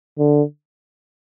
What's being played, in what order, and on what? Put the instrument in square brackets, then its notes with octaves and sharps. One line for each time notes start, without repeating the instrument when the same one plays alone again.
[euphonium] D3